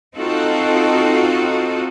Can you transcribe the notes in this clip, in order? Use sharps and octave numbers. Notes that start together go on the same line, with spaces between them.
C4 D#4 F4 F#4 A4